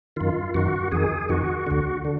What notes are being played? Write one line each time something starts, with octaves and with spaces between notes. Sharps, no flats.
F#2 D#3 F4
F#2 D#3 F#4
F2 D#3 G#4
F2 D#3 F#4
D2 D3
D3